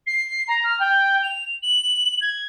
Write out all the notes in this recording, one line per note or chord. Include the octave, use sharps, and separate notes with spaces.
C7
A#5
F6
G5
F7
F#7
G#6